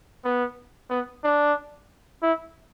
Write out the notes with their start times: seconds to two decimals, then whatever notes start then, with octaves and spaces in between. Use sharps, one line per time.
0.24 B3
0.90 B3
1.24 D4
2.23 E4